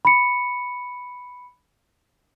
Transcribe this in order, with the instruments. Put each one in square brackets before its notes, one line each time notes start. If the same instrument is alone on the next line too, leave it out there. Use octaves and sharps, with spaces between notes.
[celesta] B5 C#7